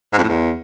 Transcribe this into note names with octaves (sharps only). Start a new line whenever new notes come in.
G#2
F2
A2
E2